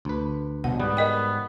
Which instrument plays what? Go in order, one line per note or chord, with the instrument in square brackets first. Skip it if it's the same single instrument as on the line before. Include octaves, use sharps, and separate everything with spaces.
[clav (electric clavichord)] D2 B4
[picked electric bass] C2 B2 [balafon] F#5
[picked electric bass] G#2 [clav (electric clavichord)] G3 [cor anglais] B3
[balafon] A#4 D#5 G5